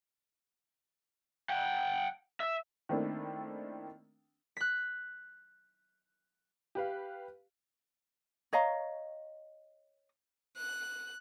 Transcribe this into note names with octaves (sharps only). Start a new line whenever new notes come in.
F#5 G5
E5
D#3 A3 A#3 C4 D4 E4
F#6 B6
G4 B4 F5
C#5 D#5 F5 A#5
F#6